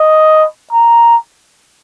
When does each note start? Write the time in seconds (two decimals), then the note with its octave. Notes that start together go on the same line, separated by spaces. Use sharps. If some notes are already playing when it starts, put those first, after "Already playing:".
Already playing: D#5
0.73 A#5